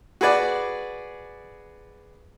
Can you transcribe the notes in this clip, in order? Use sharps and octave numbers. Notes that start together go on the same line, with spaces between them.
F#4 G#4 B4 D5